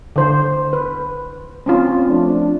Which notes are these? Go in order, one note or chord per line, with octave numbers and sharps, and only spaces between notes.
D3 C5
B4
C4 C#4 F4
F3 A3 D4